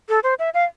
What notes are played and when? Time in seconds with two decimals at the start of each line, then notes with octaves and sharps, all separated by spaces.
0.09 A4
0.24 C5
0.39 E5
0.54 F5